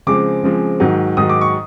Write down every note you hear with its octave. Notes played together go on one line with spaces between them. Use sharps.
C#3 F3 G#3 C4 D6
C#3 F3 G#3 C4
G#2 D#3 F#3
G#2 D#3 F#3 D#6
D6
C#6